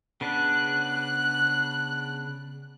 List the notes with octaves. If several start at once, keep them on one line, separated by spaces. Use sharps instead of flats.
C#3 B3 D4 F#6